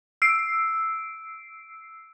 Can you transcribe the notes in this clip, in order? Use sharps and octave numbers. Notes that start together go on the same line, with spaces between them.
E6 C7 D7